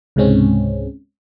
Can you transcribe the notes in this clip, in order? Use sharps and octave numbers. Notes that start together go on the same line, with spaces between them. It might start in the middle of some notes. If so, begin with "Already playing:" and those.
C#2 G#2 C3 G#3 C4 C#4